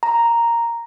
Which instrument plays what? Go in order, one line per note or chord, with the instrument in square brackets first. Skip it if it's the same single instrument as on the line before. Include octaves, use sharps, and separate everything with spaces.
[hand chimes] A#5